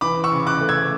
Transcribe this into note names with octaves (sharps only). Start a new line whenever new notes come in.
E3 B5 D6
C#6 E6
C#3
D6 F#6
A3
E6 G#6